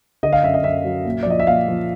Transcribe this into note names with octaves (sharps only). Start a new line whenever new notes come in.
D3 D#5
F5
F#2 E5
D#5
F#2 E5
F#3
A#2
D5
F3 D#5
E5
A#2 F5
F3